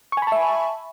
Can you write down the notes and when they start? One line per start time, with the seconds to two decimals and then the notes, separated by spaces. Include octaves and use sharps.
0.12 C#6
0.17 G#5
0.22 B5
0.27 A5
0.32 E5